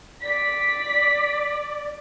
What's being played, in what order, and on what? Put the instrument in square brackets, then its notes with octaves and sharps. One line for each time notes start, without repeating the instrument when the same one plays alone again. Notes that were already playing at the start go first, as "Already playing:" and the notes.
[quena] D5 [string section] B6